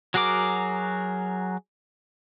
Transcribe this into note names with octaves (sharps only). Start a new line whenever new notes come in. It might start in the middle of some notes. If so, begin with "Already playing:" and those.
F#3 F#4 G#4 A#4 D6